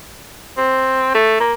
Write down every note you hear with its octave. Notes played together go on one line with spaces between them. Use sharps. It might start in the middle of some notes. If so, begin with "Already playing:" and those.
C4
A3
A#3